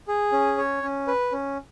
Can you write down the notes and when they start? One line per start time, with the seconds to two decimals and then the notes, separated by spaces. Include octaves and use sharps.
0.08 G#4
0.32 C#4
0.58 C#5
0.83 C#4
1.07 B4
1.32 C#4